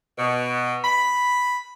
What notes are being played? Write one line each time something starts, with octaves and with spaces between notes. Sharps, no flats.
B2
B5